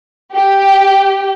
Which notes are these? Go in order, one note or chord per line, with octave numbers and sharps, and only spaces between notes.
G4